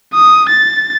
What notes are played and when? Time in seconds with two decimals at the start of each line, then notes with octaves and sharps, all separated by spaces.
0.13 D#6
0.50 A6